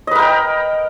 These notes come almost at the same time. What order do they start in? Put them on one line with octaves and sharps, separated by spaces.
D#5 B4 A#4 G5